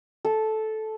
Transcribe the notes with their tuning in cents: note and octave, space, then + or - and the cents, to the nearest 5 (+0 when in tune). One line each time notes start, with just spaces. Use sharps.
A4 -10